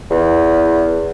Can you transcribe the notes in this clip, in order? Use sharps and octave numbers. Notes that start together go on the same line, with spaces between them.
E2